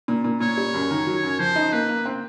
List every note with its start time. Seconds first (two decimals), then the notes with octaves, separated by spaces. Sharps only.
0.08 A#2
0.24 A#2
0.41 A#2 C#5
0.57 G3
0.74 F#2
0.90 D#3
1.07 F#3
1.23 F#2
1.39 F3 C5
1.56 D#4
1.73 A#3 B4
1.89 A#3
2.05 C4